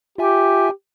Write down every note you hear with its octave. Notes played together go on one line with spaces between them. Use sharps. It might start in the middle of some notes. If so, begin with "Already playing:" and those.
F4 G4 E5 G#5